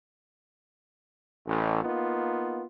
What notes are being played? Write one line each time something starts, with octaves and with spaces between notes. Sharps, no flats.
A1
A#3 B3 D#4 F4